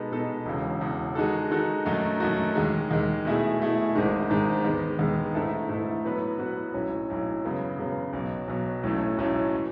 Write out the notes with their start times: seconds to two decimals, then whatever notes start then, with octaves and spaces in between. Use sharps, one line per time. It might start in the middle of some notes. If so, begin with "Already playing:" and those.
Already playing: B2 G#3 B3 D#4 A4
0.11 B2 G#3 B3 D#4 A4
0.46 E1 E2 C#3
0.81 E1 E2 C#3
1.15 D#3 G#3 D#4 F#4 A4
1.50 D#3 G#3 D#4 F#4 A4
1.85 F#2 D#3 A3 D#4 F#4
2.20 F#2 D#3 A3 D#4 F#4
2.55 D#2 D#3 G#3
2.91 D#2 D#3 G#3
3.25 B2 A3 E4 G#4
3.59 B2 A3 E4 G#4
3.95 G#1 G#2 D#3 G#3
4.29 G#1 G#2 D#3 G#3
4.64 D#2 D#3 G#3 B3
4.99 D#2 D#3 G#3 B3
5.34 G#2 E3 A3 E4 A4
5.69 G#2 E3 A3 E4 A4
6.04 A2 F#3 B3 F#4 B4
6.39 A2 F#3 B3 F#4 B4
6.74 B1 A2 F#3 C#4
7.08 B1 A2 F#3 C#4
7.44 F#2 C#3 F#3 B3
7.78 F#2 C#3 F#3 B3
8.13 B1 B2 F#3
8.48 B1 B2 F#3
8.83 B1 A2 F#3 A3 C#4
9.18 B1 A2 F#3 A3 C#4
9.55 E3